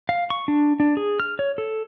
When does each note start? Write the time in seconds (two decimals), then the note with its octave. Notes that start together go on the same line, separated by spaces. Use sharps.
0.09 F5
0.30 C#6
0.48 D4
0.80 D4
0.97 G#4
1.20 F6
1.39 C#5
1.58 A4